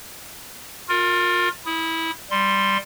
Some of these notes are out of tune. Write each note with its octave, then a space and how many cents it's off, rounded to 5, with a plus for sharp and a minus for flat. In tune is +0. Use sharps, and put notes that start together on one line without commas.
F4 +30 A#4 -10
E4 -15 D#6 +10
G3 +0 C6 +0